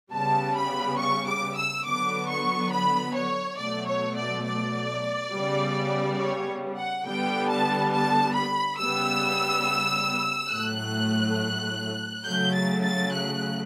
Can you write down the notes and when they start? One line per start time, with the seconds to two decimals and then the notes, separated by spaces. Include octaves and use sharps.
0.12 C#3 G3 B3 A5
0.56 B5
0.99 C#6
1.28 D6
1.57 E6
1.86 D3 F#3 B3 D6
2.29 C#6
2.72 B5
3.15 C#5
3.59 B2 F#3 A3 D5
3.87 C#5
4.17 D5
4.46 D5
5.32 C#3 G3 B3
6.19 C#5
6.77 F#5
7.05 D3 G3 B3 G5
7.49 A5
7.92 A5
8.35 B5
8.78 C#3 G3 B3 E6
10.51 A2 F#3 A3 F#6
12.25 C#3 F#3 A3 G6
12.54 A6
12.83 A6
13.12 F#6